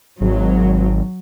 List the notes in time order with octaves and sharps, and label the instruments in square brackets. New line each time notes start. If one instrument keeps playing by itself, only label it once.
[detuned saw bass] G#1 [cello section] F#3